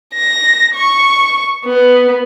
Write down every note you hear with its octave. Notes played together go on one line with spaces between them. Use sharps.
A#6
C#6
B3